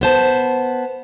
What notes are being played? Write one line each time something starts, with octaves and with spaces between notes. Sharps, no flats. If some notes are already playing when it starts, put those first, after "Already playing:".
B3 C5 A5